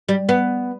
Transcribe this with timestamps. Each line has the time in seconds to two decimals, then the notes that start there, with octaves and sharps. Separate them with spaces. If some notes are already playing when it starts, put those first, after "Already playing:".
0.09 G3
0.29 B3